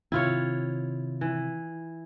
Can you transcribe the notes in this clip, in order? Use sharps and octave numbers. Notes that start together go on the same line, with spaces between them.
C3 D#3 C4 E4 F4 C#5
E3